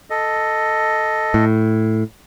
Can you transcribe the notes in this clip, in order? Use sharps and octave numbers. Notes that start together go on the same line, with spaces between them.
A4 D#5
A2